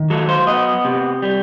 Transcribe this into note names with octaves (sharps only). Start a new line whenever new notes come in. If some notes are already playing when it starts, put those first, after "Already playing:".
Already playing: D#3
F#3 A4
C5
B3 D#5
C3
G3